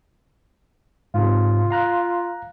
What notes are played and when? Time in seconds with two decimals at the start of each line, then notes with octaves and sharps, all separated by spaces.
1.14 G#2 C3 F4
1.71 F5 A#5 F#6